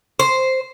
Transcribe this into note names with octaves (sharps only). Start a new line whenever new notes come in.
C5